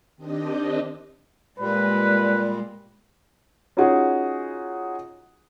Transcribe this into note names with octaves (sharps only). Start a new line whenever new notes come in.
D#3 C4 D4 G4 D#5
A#2 G3 G#3 B4
C#4 D#4 F4 F#4 G#4